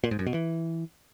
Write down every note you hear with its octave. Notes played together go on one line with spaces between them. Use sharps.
A#2
G#2
F#2
B2
E3